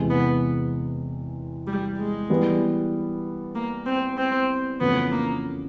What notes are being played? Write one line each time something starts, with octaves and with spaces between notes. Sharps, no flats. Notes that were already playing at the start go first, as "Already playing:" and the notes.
Already playing: E2 C3 E3 G#3
B3
G3
G#3
E3 G3 B3
A#3
C4
C4
F2 C#3 E3 A3 B3 C#4
A#3